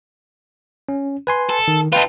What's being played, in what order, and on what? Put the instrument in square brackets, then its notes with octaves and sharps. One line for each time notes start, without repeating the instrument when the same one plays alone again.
[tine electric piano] C#4
B4 G#5 C6
[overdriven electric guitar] A4
[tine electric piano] D#3
[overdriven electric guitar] D#4 F4 [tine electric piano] B4 G5 A5